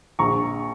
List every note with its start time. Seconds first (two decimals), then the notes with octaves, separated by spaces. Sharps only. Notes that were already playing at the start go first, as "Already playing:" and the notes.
0.19 A#1 A#5 C#6